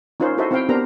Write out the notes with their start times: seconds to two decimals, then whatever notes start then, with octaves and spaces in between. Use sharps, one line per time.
0.20 C#4 D#4 F4 A#4 C5
0.38 E4 F#4 A4 C5 D#5 E5
0.51 C4 E4 C5 F5 G5
0.69 B3 D4 G4 A#4 C5 A#5